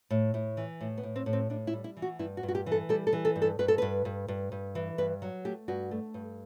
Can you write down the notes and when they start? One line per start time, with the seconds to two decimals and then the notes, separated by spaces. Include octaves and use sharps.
0.10 A2
0.34 A2
0.57 E3
0.81 A2
0.98 B3
1.03 A2
1.16 C4
1.26 A2
1.33 C4
1.50 A2 D4
1.67 E4
1.73 G3
1.84 E4
1.97 E3
2.02 F#4
2.19 G2 E4
2.37 F#4
2.43 G2
2.48 F#4
2.55 G4
2.66 E3
2.72 A4
2.89 G3 A4
3.07 A4
3.13 E3
3.25 A4
3.36 G2
3.42 A4
3.59 G2 B4
3.68 A4
3.78 G2 B4
4.05 G2
4.28 G2
4.52 G2
4.75 E3
4.98 G2 B4
5.22 F#3
5.45 A3 G4
5.68 G2 F#4
5.91 A3
6.14 G2